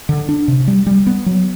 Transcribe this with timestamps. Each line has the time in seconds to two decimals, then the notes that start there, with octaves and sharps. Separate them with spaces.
0.09 D3
0.29 D4
0.48 C3
0.68 G3
0.87 G3
1.07 B3
1.26 F#3